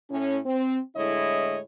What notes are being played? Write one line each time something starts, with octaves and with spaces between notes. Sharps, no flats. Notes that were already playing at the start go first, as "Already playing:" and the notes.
A2 C#4
C4
A2 D3 G#3 E4 C#5 D#5